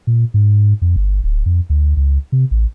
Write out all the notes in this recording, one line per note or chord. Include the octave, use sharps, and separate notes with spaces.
A#2
G#2
F2
G1
D1
F2
D2
C#2
C3
A1